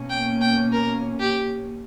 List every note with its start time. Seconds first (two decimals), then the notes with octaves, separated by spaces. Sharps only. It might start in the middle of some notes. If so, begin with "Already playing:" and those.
Already playing: B2 A#3 C#4
0.10 G5
0.41 G5
0.72 A#4
1.20 G4